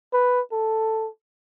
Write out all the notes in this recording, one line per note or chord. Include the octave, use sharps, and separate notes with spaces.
B4
A4